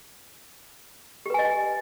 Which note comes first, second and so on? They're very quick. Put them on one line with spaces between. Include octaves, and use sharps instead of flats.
G4 B4 G#5 D#5